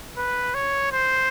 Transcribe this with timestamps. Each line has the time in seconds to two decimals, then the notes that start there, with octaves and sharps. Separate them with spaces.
0.17 B4
0.54 C#5
0.92 C5